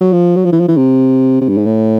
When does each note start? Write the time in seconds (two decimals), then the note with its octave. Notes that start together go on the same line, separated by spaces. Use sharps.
0.01 F#3
0.13 F3
0.36 F#3
0.45 F3
0.52 E3
0.60 F3
0.68 E3
0.77 C3
1.41 C3
1.49 G2
1.58 G#2
1.65 A2